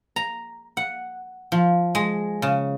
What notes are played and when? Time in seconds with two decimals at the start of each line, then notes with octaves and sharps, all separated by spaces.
0.16 A#5
0.77 F#5
1.52 F3
1.95 G#3
2.42 C#3